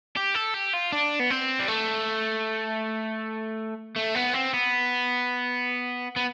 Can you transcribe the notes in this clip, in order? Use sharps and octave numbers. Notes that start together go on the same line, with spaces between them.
G4
A4
G4
F4
D4
B3
C4
G3
A3
A3
B3
C4
B3
B3